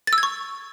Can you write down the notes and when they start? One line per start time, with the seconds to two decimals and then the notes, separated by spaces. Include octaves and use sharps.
0.07 A6
0.13 E6
0.18 G#6
0.23 C#6